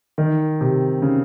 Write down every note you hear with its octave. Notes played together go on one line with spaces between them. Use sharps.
D#3
C3
C#3